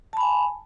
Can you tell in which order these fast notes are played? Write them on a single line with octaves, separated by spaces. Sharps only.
A5 B5 G#5